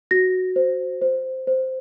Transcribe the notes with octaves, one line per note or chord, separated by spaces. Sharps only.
F#4 A#6
C5
C5
C5